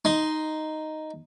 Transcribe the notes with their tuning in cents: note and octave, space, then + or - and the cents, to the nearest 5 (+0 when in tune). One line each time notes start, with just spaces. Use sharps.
D#4 +0 C6 +0